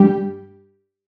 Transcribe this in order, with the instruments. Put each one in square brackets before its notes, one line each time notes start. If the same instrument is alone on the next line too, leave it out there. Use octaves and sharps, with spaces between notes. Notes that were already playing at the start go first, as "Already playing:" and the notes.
Already playing: [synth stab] G2 G3 G4